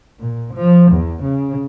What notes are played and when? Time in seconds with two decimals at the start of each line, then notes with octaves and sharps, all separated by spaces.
0.19 A#2
0.54 F3
0.91 E2
1.23 C#3